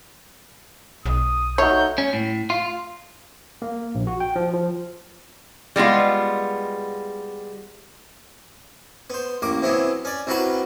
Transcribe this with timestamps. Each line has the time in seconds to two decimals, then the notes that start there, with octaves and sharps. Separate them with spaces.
1.06 B1 D#6
1.58 A3 D#4 F#4 C#5 G6
1.98 C#4
2.13 A2
2.50 F4
3.62 A#3
3.95 A#1
4.07 F#4
4.20 G5
4.36 F3
4.53 F3
5.76 G3 G#3 B3 F4
9.10 B3 C5
9.42 A1 A#3 D6
9.62 C3 E3 F#3 B3
10.05 C#4 D5
10.27 C2 F#3 G3 F#4 B4 A#5